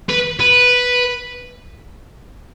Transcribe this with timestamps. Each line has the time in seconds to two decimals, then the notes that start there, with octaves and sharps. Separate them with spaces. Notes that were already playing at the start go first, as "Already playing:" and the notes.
0.09 B4
0.40 B4